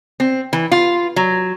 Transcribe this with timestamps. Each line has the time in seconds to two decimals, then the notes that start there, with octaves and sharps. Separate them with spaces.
0.20 C4
0.53 E3
0.72 F4
1.16 F#3